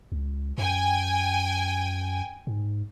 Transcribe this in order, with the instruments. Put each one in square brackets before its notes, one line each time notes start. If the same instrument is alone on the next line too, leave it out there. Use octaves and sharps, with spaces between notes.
[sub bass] C#2
[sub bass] F#2 [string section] G5 G#5
[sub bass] G#2